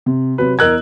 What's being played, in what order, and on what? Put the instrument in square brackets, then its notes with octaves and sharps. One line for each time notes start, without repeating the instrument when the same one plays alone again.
[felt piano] C3
[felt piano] C3 F#3 [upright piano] B4
[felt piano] E2 D#5 E6 [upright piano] A#4 F#6 G#6